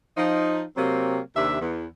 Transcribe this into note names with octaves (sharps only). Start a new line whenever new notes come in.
F3 D#4
C3 F#3 A#3 C4
D#2 C3 D4 E5
E2